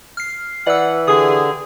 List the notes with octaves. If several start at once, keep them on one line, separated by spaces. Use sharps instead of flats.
F6 C7
E3 D5 F#5 E6
D3 G4 G#4 D#6